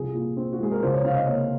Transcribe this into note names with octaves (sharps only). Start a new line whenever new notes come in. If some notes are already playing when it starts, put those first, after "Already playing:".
Already playing: C2 F3 G#4
A#2
C4
F#4
G#3 G#4
A#4
C#2 C5
C#5
C3 F5
D#5
A#3 C#5